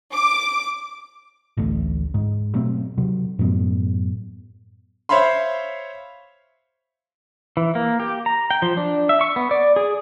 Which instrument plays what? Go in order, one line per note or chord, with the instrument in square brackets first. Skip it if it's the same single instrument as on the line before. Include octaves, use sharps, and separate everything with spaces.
[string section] D6
[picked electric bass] A1 D2 A2
G#2
B2 F#3 A3 C4
C3 F#3
F#2 A2 F#3 B3
[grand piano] C5 C#5 E5 F5 B5 C6
[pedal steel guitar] E3
A#3
G4
A#5
G5
F3
D4
E5
C#6
B3
D5
G#4